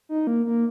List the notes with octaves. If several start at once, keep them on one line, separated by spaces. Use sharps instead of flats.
D#4
A#3
A#3